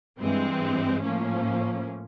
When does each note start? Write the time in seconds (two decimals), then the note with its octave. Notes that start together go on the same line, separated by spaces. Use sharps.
0.19 G2 E3 G#3 C4
1.02 A2 F3 A#3 C#4